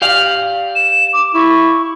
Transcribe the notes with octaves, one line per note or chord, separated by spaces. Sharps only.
G4 D5 F5
E7
D6
E4 C#6